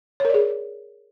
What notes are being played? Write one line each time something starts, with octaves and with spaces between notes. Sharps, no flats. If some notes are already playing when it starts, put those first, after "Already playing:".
G#4 A#4 C#5 D5